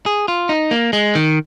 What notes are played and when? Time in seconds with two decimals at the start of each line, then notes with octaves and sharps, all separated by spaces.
0.06 G#4
0.28 F4
0.49 D#4
0.71 A#3
0.93 G#3
1.15 D#3